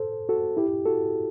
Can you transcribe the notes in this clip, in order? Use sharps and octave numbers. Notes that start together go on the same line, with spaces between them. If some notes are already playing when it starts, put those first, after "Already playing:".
Already playing: A4 C5
F#4 A4
E4 G4
F#4 A4